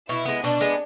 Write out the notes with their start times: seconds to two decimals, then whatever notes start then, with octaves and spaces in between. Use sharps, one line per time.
0.09 B2 E4
0.25 G#3 B3
0.43 B2 D4
0.61 G#3 B3